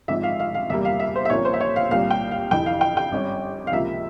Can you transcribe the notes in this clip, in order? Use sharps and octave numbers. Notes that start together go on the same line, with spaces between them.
G#1 G#2 F3 E5
F5
F5
F5
E2 C3 G3 A#3 E5
F5
E5
C5
E5
C2 A#2 F3 A#3 C#4 C#5
C5
E5
C#5
F5
C2 A#2 G3 F5
G5
F5
F1 F2 E3 G5
F5
G5
G5
G#1 G2 G3 C#4
F5
C#2 C3 F3 A#3 E5